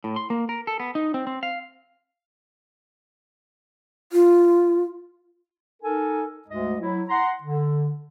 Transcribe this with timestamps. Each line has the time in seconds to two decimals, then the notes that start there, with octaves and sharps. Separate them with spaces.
0.04 A2
0.16 C6
0.30 A#3
0.49 A#4
0.67 A4
0.80 B3
0.95 D#4
1.14 C4
1.27 C4
1.43 F5
4.12 F4
5.83 D#4 A4 A#4 G#5
6.48 D2 G#2 G#3 D#5
6.79 F#3 E4
7.09 F#5 A#5 C6
7.42 D3